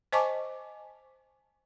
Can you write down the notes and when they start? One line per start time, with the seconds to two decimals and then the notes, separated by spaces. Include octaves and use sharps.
0.13 C5 D#5 G#5 A5 C#6 D6